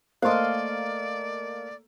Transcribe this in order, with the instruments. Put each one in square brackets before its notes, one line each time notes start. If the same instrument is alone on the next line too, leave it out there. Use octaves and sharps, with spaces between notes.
[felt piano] A3 A#3 [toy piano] C5 C6 [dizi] D5 [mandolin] D#5 F5